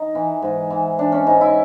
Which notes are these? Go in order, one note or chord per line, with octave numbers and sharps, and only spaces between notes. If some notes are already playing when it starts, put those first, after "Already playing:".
Already playing: D#4
E3
G#2
E3
E3 D4
C#4
G#2 D#4
E4